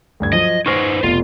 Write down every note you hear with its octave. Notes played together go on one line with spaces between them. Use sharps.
D2 G2 G#6
F3 F#3 D#5
D#4 B4 C5 C#6 F6 A#6
F1 B2 F4